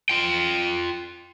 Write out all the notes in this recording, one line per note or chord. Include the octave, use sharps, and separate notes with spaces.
F4 G5